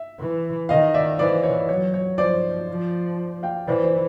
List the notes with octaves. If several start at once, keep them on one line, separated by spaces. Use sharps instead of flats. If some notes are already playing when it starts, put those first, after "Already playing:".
Already playing: E5
E3
D#3 D#5 F5
D5 E5
E3 C5 D5
C#5
F#3 C#5
C#5
F3 C5 D5
F3
F5 G5
E3 C5 D5
C5 D5